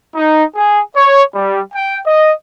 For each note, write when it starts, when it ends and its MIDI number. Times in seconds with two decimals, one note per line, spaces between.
0.15 0.43 63
0.55 0.80 68
0.95 1.22 73
1.34 1.60 55
1.74 1.98 79
2.06 2.32 75